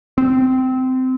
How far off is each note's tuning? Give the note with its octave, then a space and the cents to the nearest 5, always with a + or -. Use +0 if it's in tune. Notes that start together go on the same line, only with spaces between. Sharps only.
C4 -20